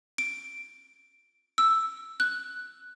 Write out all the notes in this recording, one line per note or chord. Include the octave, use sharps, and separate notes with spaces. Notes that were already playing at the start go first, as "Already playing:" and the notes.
D7
E6
F#6